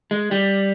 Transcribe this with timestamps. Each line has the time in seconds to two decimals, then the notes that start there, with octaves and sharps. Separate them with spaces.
0.11 G#3
0.31 G3